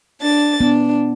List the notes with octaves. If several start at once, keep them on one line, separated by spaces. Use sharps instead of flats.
D4 A6
B3 D4